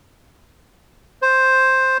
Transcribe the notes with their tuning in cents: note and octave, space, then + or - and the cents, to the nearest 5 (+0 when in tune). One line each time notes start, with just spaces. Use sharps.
C5 +5